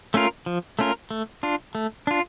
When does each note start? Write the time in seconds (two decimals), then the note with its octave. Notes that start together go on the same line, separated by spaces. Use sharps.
0.14 A3 C#4 F4 A#4
0.46 F3
0.79 A3 C#4 F4 A#4
1.11 A3
1.43 D4 F4
1.75 A3
2.07 D4 F4